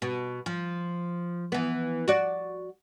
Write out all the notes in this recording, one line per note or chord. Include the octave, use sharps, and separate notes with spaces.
B2
F3
E3 B3
F#4 D5